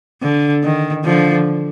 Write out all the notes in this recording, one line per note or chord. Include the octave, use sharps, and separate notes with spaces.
D3
D#3
D3 F3